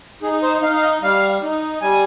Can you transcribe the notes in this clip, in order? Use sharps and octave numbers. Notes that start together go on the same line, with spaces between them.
D#4 G#4
C5
D#4 F5
F5
D#5
G3 F5
D#4
G3 G#5